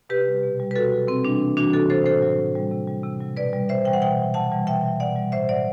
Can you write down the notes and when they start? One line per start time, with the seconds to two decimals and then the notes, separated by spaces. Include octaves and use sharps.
0.09 C3 G4 B4
0.27 G3
0.43 B2
0.60 G3
0.71 B4
0.76 B2 F#4 A4
0.92 F#3
1.08 C3 C4
1.24 G3 D4
1.28 E3
1.41 C3
1.57 E3 G3 D4 F#4
1.73 C3 F#4 A4
1.90 F#3 A4 C5
2.06 A2 A4 C5
2.23 F#3
2.39 A2
2.55 G3
2.72 C3
2.87 G3
3.04 C3
3.21 F#3
3.37 B2 B4 D5
3.53 G3
3.69 A2 C5 E5
3.85 E3 G3 G5
3.93 F#5
4.02 B2 E5 G5
4.18 F#3
4.34 C3 F#5 A5
4.51 E3 G3
4.67 B2 E5 G5
4.83 F#3
5.00 B2 D5 F#5
5.16 G3
5.32 A2 C5 E5
5.49 F#3 D5 F#5